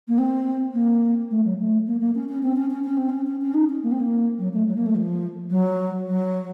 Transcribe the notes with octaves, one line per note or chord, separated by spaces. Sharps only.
A#3
C4
A#3
A3
F#3
A3
A#3
A#3
C#4
C#4
C4
C#4
C#4
C#4
C4
C#4
C#4
C#4
D#4
C#4
A#3
C4
A#3
F#3
A3
F#3
A#3
A3
F3
F#3
F#3